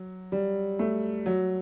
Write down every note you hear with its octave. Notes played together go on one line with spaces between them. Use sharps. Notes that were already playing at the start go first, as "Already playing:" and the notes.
Already playing: F#3
G3
A3
F#3